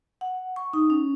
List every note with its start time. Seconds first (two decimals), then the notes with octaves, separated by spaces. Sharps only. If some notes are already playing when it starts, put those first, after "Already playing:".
0.21 F#5
0.56 C#6
0.73 D#4
0.90 C#4